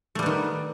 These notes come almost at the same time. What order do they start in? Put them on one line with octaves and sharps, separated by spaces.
A3 G3 B3 D#3